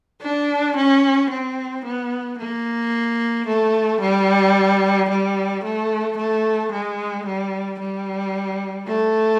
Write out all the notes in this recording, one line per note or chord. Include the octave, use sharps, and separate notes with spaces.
D4
C#4
C4
B3
A#3
A3
G3
G3
A3
A3
G#3
G3
G3
A3